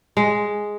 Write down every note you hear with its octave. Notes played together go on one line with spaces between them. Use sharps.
G#3